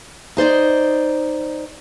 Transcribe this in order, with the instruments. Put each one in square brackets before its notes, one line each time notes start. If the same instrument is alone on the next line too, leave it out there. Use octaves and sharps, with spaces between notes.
[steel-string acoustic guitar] D#4 C5 D5 D#5